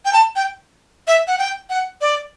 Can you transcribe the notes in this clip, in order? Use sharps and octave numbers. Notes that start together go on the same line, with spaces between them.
G5
A5
G5
E5
F#5
G5
F#5
D5